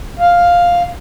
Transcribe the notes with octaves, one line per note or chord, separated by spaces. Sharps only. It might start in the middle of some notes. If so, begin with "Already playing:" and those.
F5